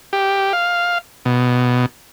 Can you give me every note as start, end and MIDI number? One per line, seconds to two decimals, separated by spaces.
0.13 0.53 67
0.53 0.98 77
1.25 1.86 47